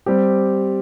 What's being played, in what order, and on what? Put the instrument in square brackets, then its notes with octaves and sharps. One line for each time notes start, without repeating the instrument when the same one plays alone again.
[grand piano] G3 C4 G4